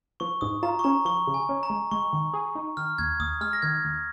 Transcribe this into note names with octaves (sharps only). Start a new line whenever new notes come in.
F3 C#6
G#2 D#6
F4 A#5
C#6
C#4 A#5
F3 C#6
C#3
G#5
C#4
A#5
G#3
G#3 C#6
D#3
G#4
D#4
D#3 F6
D#2 G#6
D#2 D#6
G#3 F6
A#6
D#3 G#6
D#2